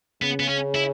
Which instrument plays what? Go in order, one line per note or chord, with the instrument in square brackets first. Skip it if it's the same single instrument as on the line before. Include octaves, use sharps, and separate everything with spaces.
[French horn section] C#3 [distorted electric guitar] B3
[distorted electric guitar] B3
C#4
E4